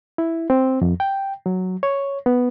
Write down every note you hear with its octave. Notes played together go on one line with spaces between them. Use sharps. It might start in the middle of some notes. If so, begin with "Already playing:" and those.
E4
C4
F2
G5
F#3
C#5
B3